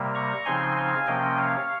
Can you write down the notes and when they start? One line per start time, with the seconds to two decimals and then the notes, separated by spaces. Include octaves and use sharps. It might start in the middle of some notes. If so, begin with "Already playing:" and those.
Already playing: C3 G3 A#3
0.14 A#5 C#6
0.45 C#3 F3 C4 D#4 G#5 C6
0.76 F5 G#5
1.07 C3 F3 A#3 C#4 D#5 G5
1.37 C#5 F5